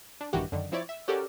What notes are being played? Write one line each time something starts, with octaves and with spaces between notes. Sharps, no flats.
D4
A#1 G2 D#3 E3 F#4 G4
F#2 D3 D#3
F3 C4 E4 C#5 D5
E5
C#4 F#4 G4 A4 A#4 D5